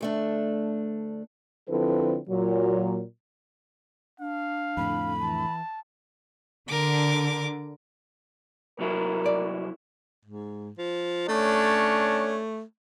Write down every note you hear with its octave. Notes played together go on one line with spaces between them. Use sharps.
D2 A3 D4
D3 F3 C4 E4 A4 B4
A#2 F#3
D4 F5
F2 A2 D3 B5
E3 A5
D3 A#4 D6
C2 F#3 E4 A#4
D5
G#2
F3
A3 C#4 D4 C#5